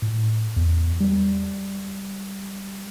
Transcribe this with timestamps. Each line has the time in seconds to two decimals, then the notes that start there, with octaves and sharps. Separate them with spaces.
0.02 A2
0.57 E2
1.01 G3